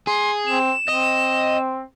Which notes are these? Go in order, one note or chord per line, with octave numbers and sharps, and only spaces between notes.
G#4 C6
C4 E7
C4 D#5